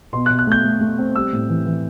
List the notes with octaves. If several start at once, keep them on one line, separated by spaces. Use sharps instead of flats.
B2 C6
F#6
B2
F#6
A3 G6
A3
A3
C4
G3 E6
A2
E3
E3